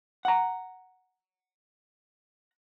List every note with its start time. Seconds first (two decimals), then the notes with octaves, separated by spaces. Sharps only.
0.25 F#5 A#5